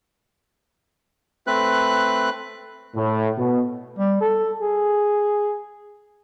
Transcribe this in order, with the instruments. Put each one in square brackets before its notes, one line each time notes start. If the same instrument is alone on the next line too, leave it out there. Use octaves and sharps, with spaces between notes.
[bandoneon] A3 C4 B4 F#6
[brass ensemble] A2
B2
[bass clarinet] G3
A4
G#4